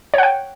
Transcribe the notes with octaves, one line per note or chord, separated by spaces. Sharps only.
C#5 F#5 G5